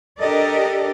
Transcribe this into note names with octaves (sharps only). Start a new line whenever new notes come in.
D4 G4 A4 A#4 D5 D#5